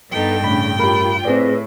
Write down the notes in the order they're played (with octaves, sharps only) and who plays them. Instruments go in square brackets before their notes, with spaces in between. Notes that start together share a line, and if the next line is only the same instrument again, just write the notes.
[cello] G2 G5 [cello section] B3 D#4 A4
[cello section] A2 C#3 D4 [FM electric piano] B5
[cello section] F4 [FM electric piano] G4 A#4 [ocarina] B5
[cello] A2 [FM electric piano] C4 G#4 D5 [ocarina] B4